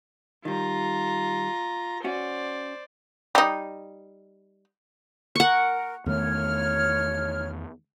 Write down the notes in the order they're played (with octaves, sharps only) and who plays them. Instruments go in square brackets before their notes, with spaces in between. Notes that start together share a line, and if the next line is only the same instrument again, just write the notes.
[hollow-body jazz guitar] D#3 G3 [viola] F4 A#5
[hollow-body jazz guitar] C#4 F#4 [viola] C5 D5
[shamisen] G3 D#4
[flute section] A#4 [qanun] F#5 C#6
[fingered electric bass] E2 D#3 A3 [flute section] C#5 F6